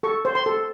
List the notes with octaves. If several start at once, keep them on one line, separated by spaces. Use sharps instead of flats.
A4 C#6
C5
C6
A4